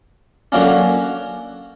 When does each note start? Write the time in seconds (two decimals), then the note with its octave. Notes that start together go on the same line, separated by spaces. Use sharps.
0.52 D3 F#3 A#3 C#4